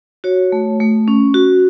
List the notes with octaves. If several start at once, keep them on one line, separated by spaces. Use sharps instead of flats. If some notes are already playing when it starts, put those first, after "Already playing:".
F#4 C#5
A3
A3
C#4
F#4